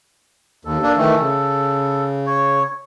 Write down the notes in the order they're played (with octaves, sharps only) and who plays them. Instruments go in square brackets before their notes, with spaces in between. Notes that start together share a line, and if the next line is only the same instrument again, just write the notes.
[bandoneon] D#2 [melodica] A4
[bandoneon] A#3 D4
D#3 E3 A3
C#3
[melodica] C#5